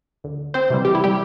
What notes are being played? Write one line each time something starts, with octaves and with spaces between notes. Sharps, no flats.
D2
C4 C5
C3 E3 G3
G4
E4
G3 G4